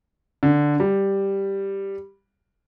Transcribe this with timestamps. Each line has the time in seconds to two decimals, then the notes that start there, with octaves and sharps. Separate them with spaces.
0.43 D3
0.80 G3